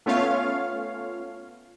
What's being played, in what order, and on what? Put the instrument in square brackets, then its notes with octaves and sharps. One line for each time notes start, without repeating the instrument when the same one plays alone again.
[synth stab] A3 B3 C#4 F4 C#5 F5